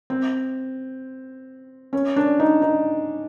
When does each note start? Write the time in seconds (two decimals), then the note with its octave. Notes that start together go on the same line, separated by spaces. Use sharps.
0.10 C4
1.93 C#4
2.16 D4
2.40 D#4
2.62 D#4